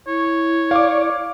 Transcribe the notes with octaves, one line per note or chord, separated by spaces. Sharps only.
E4 C#5
D5 F5 D6